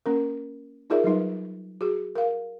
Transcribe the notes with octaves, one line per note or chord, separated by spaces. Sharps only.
A#3 C#4 A#4
D#4 F4 G#4 A#4 D5 E5
F#3 G3 D#4 B4
F#4 G#4
A#4 F5